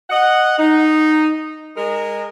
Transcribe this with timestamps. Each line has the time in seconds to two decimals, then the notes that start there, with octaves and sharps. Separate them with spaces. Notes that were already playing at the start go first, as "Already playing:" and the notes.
0.10 D#5 F#5
0.58 D#4
1.76 G#3 A#4